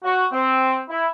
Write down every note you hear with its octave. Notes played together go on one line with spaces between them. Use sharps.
F#4
C4
E4